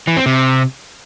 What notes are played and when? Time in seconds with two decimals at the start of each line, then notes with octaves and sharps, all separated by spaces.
0.07 E3
0.17 C4
0.26 C3